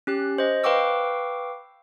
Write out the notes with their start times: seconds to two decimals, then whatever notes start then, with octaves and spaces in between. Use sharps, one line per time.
0.07 C#4 G4 F#6
0.38 C5 D#5
0.64 B4 F5 G5 C#6 D6 E6